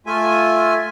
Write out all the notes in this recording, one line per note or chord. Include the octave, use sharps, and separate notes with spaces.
A3 F4 E5 G#5